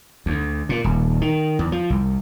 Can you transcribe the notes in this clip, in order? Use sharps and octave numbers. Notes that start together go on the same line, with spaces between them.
D2
A#2
D#1
D#3
E2
F3
C2